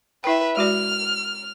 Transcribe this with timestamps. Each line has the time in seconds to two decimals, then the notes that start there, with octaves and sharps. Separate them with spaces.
0.24 E4 B4 E5 G5
0.57 G#3 F#4 D5 F6